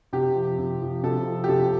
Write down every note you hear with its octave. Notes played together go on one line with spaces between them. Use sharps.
C3 G4
F3
C3
F3
C3 A4
F3
G4
C3 A4